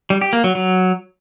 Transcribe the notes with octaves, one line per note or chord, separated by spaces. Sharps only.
G3
G4
A#3
F#3
F#3